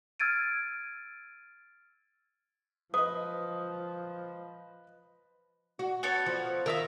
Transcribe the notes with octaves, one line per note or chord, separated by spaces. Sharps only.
E6 F6 G#6 A6 D7 D#7
F3 B4 D#5 D#6
F#4
B3 A4 C#5
F3
D#3 A#4 E5 F5